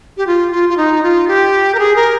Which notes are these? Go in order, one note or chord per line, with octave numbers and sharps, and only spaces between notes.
G4
F4
F4
F4
D#4
F4
G4
A#4
G#4
A#4